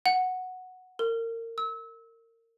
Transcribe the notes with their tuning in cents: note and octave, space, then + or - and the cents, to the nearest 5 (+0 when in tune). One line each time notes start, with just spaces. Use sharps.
F#5 -5
A#4 -30
E6 -30